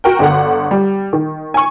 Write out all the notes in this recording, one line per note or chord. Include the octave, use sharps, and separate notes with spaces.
F#4 A#4 G5
G1 D3 F#5
G3
D#3
G#5 C#6